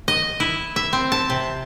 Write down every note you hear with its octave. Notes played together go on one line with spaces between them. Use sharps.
D#5
E4
E5
C4
A5
C3